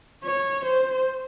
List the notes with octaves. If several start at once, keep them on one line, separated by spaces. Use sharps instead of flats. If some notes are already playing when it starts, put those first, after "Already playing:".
C#5
C5